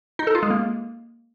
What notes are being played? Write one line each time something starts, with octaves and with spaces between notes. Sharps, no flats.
D#4
A4
F4
G#3
A#3